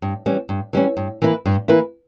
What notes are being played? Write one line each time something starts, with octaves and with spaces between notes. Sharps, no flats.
G2
E3 G3 C#4
G2
E3 G3 C#4
G2
E3 A#3 E4 B4
G2
E3 A#3 E4 B4